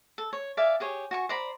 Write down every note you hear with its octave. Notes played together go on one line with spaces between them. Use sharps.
A4
C#5
D5 E5 F5 G#5
G4 G#4 C#5
F#4 G#5 C#6
C5 D5 A#5 B5